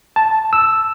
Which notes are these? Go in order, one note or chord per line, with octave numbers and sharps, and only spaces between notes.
A5
E6